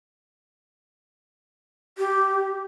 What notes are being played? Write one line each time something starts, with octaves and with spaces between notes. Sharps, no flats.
G4